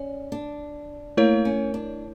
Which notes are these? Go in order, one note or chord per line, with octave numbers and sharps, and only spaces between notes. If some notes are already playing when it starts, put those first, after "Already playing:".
Already playing: C#4 D5
D4
A3 A#3 E4 A#4 C#5
C#4
D4